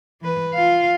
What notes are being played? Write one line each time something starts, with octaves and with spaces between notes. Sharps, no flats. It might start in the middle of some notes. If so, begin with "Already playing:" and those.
E3 B4
F4 F5